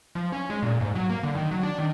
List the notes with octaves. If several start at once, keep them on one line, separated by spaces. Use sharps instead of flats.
F3
C#4
G#3
A#2
G#2
F#3
A#3
D3
D#3
F#3
D4
D#3